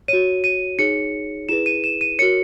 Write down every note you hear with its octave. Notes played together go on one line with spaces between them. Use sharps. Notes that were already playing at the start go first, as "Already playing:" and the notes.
F#4 C#5 D#7
D#7
D#4 G#4 C#5 C#7
E4 G#4 B4 E7
D#7
E7
D#7
F#4 A#4 C#5 C#7